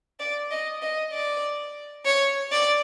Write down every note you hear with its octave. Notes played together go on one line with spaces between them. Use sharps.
D5
D#5
D#5
D5
C#5
D5